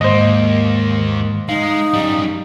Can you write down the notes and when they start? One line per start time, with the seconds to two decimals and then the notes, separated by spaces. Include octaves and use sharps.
0.01 D#2 G#2 A#3 C5 D#5
1.49 G#3 D#4 F5
1.94 F#2 G3